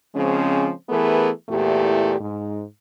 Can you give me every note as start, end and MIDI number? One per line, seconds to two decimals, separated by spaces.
0.15 0.70 49
0.15 0.70 53
0.15 0.70 56
0.15 0.70 60
0.15 0.70 61
0.89 1.30 52
0.89 1.30 57
0.89 1.30 59
0.89 1.30 68
0.89 1.30 70
1.49 2.16 40
1.49 2.16 46
1.49 2.16 57
1.49 2.16 64
1.49 2.16 67
2.20 2.63 44